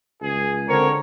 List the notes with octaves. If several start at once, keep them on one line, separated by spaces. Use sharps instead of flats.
C#2 G#4
D3 C4 A#4 C#5